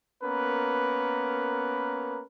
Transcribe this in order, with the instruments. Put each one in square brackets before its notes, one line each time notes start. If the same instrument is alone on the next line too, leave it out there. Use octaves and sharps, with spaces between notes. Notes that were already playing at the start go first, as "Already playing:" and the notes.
[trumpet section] A#3 B3 C#4 A#4 B4